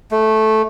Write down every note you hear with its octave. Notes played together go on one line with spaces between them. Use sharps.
A3